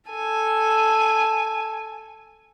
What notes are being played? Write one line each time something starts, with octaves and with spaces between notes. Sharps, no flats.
A4 G#5